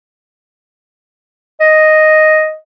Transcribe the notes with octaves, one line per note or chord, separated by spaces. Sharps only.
D#5